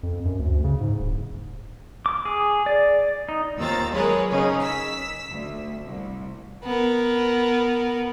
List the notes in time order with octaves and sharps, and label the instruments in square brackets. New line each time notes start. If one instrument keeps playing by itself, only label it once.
[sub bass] F2
F#2
D2
C#3
G#2
D1
[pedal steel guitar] D6
G#4
D5
D#4
[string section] D#2 C4 F4 A#5 E6 A6
F#3 G#3 G#4 A#4 B4 C#5
C#3 C#4 D#4 G#4
E6 B6
D2
C2
[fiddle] B3 A#4